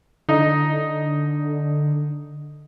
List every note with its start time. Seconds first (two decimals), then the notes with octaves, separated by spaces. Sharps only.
0.29 D3 D#4